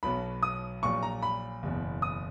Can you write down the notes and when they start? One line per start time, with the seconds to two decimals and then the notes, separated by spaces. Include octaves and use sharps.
0.03 B1 B2 F#3 B5
0.43 D#6
0.83 A#1 A#2 F#3 C#6
1.03 A#5
1.23 B5
1.63 F#1 E2 B2
2.02 D#6